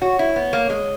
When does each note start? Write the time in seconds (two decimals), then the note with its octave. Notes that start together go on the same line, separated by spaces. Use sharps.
0.01 F#4 C#5
0.19 E4
0.36 B3
0.53 A#3
0.70 G#3